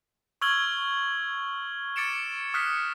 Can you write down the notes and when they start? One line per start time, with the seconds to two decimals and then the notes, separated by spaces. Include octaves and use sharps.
0.41 C#6 E6 F6 G#6 F#7 G7
1.96 D6 A6 C#7 D7 E7
2.54 D#6 F6 F#6 B6 C#7